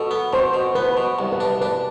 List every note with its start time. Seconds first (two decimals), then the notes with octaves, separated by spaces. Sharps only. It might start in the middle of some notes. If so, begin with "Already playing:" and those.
Already playing: B2 A4
0.11 B3
0.33 B2 C5
0.54 B2
0.75 B3 B4
0.97 B2
1.19 C2
1.32 B4
1.40 D4
1.61 D4 B4